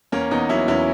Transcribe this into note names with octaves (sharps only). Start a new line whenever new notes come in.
E2 A#3 C#4
E2 B3 D#4
F#3 C#4 E4
E2 C#4 E4